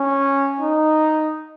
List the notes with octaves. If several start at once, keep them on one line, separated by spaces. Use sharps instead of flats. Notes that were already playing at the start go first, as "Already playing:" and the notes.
Already playing: C#4
D#4